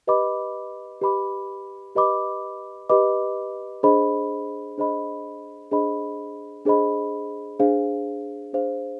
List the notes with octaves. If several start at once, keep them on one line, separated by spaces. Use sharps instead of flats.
G4 B4 D#5 B5 D6
G4 B4 D#5 B5 D6
G4 B4 D#5 B5 D6
G4 B4 D#5 B5 D6
D4 G#4 C5 D#5 B5
D4 G#4 C5 D#5 B5
D4 G#4 C5 D#5 B5
D4 G#4 C5 D#5 B5
D4 G#4 C5 F5
D4 G#4 C5 F5